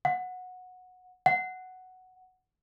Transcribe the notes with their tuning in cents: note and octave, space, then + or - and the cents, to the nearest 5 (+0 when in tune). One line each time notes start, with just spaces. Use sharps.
F#5 -15
F#5 +5